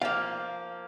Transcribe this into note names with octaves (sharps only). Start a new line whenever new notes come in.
F3 A#3 F5